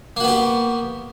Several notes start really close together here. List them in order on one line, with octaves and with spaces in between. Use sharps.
A#3 F#4 B3 G4